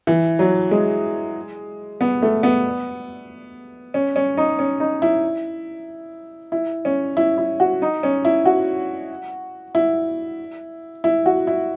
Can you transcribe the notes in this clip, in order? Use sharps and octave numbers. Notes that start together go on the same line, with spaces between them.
E3
F#3
G#3
B3
A3
B3
C#4
C#4
D#4
C#4
D#4
E4
E4
C#4
E4
E4
F#4
D#4
C#4
E4
F#4
E4
E4
F#4
E4